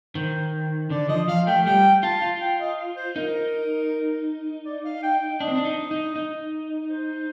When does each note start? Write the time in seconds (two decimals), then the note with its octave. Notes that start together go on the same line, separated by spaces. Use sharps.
0.15 D#3 C5
0.53 C5
0.90 D3 D5
1.09 F3 D#5
1.28 F3 F5
1.47 A3 G5
1.66 G3 G5
2.03 F4 A5
2.22 F4
2.41 G5
2.60 D#5
2.96 C5
3.16 D#4 A#4
4.65 D5
4.85 F5
5.03 G5
5.22 G5
5.40 D4 D#5
5.48 C4
5.55 D4
5.65 D#4
5.91 D#4
6.16 D#4
6.90 C5